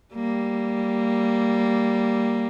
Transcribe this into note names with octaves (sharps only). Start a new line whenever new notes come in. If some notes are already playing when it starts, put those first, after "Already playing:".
G3 A#3